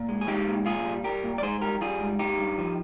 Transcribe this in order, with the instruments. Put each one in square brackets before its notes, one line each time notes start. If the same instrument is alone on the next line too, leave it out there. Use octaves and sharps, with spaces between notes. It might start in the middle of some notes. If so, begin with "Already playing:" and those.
Already playing: [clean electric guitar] A#2
G#3
G#4
G#3 D#4 G4
A#2
A#2 F4 G#4
G3
G3 G4 A#4
A#2
D5
G#2 G#4 C5
G3 G4 A#4
G3 F4 G#4
G#2
G#3 D#4 G4
G2
F3